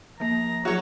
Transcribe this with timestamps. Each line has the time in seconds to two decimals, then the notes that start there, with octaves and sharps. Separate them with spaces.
0.20 F3 A#3 A#5
0.65 F#3 F#4 G#4 C#5 E5